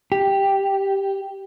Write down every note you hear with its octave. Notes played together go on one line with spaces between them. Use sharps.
G4